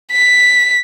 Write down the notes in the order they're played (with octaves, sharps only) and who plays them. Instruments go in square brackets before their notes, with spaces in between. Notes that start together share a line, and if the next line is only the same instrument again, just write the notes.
[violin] B6